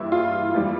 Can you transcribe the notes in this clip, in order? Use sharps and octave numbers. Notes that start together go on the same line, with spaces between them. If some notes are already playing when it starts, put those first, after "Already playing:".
Already playing: G2 E3 G3 E4
F4
F2 E3 G3